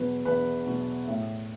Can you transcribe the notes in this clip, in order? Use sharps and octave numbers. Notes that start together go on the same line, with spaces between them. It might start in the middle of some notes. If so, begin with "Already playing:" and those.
Already playing: E2 B2 F#3 B4
E2 B4
B2 F#3
A2